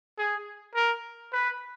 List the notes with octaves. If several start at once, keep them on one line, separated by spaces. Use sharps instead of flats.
G#4
A#4
B4